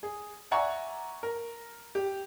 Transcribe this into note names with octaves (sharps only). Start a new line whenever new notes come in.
G#4
D5 E5 F#5 G#5 A#5 C#6
A#4
G4